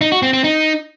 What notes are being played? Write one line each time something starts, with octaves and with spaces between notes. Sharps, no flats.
D#4
F#4
C4
C4
D#4